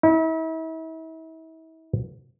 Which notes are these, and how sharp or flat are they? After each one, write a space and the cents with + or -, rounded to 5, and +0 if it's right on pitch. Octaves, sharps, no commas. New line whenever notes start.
E4 -40